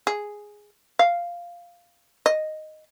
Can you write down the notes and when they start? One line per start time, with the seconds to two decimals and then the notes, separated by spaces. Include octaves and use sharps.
0.07 G#4
0.99 F5
2.26 D#5